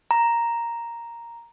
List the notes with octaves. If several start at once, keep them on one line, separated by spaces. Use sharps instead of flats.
A#5